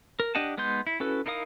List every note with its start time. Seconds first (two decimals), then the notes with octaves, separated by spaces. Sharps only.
0.20 A#4
0.35 D4 G4 D#5 F#5 A5
0.58 G#3 B3 D#4 C6 G6
0.87 E4
1.00 C#4 E4 F#4 A4 B4
1.26 D#4 E4 A#4 F5 D#6